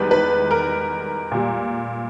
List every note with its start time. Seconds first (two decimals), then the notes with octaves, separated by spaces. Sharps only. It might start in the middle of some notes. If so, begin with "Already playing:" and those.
Already playing: E2 D#3 G3 B4
0.11 B4
0.51 A#4
1.32 A#2 G3